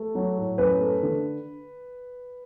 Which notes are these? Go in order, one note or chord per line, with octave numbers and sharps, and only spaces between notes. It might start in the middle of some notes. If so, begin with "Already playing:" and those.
Already playing: A3
F#3
A2
F#2 B4
A3
D3